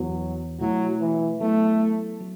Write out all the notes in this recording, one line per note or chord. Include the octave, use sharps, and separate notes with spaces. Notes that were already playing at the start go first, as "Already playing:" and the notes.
Already playing: E2 E3 F#3 B3 F#4
B2 F#3 A3 E4
E3
F#3 A3 B3 E4
F#3